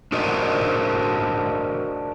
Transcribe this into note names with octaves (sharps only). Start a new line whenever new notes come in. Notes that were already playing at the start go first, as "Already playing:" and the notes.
D4 F#4 A#4 C5 D5 D#5